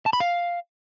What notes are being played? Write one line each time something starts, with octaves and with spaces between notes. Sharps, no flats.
A5
B5
F5